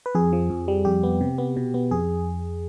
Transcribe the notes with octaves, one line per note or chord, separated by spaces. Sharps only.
B4
F2 G#4
F3
F2
G3
F2 G4
B3
C3
B3
B2
B3
F2 G#4